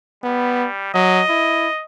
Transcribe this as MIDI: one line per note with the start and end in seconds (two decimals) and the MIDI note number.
0.24 0.93 55
0.24 0.68 59
0.94 1.23 54
0.94 1.84 75
1.29 1.68 64